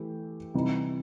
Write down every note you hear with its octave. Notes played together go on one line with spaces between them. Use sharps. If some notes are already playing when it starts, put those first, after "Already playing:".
Already playing: E3 A3 E4 G4
C3 E3 G3 D#4